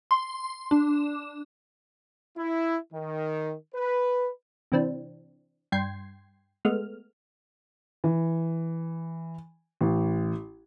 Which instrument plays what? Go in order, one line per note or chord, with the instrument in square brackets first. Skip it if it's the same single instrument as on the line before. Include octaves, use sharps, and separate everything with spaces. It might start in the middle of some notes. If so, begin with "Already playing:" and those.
[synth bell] C6
D4
[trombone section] E4
D#3
B4
[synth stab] C3 E3 C4 D4
G2 G5 C6 G#6 C7
G#3 A3 B3 F6
[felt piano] E3
A1